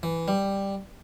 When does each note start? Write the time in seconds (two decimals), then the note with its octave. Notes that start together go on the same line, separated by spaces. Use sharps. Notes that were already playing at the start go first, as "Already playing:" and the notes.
0.03 E3
0.28 G3